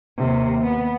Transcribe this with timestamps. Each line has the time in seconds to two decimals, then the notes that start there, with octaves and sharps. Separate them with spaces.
0.18 D#2 C3
0.64 B3